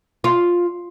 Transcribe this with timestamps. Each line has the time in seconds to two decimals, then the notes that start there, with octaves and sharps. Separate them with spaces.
0.24 F4